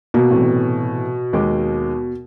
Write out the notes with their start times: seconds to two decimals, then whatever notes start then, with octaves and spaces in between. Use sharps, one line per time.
0.14 B2 A#3
0.31 A2 C3 E3
1.33 D#2 G#3 D6